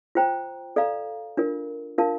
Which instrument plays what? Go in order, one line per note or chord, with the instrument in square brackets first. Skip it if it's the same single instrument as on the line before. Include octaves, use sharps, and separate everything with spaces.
[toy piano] F4 C5 G5 A#5
A4 D5 F5 A#5
D4 F4 A#4
D4 F4 A#4 F5 A5